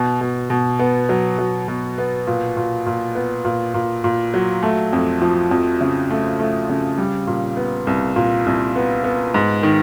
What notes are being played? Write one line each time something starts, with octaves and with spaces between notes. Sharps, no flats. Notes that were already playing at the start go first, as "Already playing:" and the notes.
Already playing: B2
B2
B2
B3
F#3
F#3
B2
B3
A#2
A#2
A#2
B3
A#2
A#2
A#2
F#3
A3
F2
F3
F2
C#3
A3
A3
C#3
G3
A#2
B3
C2
A#2
C2
B3
B3
G#2
D#3